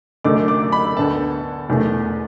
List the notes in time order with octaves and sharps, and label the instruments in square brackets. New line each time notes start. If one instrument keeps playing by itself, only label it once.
[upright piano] F#1 F#2 D3 A3 D6
D6
B5
D2 D3 B3 A5
E1 E2 E3 A3